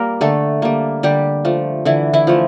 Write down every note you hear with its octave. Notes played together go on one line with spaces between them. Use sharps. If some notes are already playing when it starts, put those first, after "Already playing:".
Already playing: G3 A#3 A#4
D3 A3 A4
G3 A#3
D3 G3 G4
F3 A3
D3 E3 E4
E3 E4
F3 A3